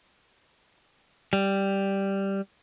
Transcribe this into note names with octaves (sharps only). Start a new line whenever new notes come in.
G3